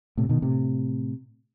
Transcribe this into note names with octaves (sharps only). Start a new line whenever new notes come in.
A2 C3
B2 D#3
A2 C3